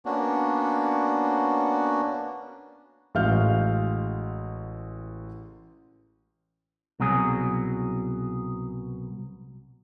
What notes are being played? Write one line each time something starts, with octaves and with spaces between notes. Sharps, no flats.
A#3 B3 C#4 D4 F#4
A1 G#3 F#4 F5 F6 G6
C2 B2 F#3 G#4